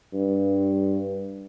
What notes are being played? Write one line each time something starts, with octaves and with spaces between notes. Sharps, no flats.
G2